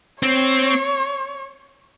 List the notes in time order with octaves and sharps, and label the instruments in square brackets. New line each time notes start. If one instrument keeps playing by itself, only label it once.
[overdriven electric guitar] C4 [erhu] C#5